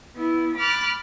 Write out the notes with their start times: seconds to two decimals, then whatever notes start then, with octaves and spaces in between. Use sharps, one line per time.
0.16 B3 E4
0.57 B5 D6 F6 F#6 A6